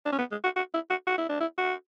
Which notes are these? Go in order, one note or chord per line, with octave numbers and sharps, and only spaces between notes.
D4
C#4
B3
G#3
F#4
F#4
E4
F#4
F#4
E4
D4
E4
F#4